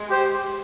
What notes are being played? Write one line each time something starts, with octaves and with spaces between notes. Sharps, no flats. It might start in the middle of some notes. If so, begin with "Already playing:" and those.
Already playing: G#3
G4 C5